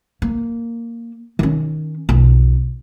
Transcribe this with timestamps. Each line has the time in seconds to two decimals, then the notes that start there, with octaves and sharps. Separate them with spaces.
0.22 A#3
1.39 D#3 C#4
2.09 B1 F2